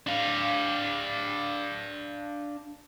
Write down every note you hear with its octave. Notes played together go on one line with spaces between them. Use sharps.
D4 F5